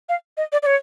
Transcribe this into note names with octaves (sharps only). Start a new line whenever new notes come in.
F5
D#5
D5
D5
C#5